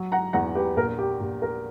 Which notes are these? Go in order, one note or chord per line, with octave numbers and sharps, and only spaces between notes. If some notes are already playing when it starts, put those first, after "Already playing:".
Already playing: F#3
F#5 A#5
E2 F#5 A#5
G4 B4
A#1 A#4
G4
A#1
A#4